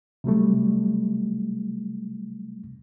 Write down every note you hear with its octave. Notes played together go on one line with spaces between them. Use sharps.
C3 F#3 G3 A3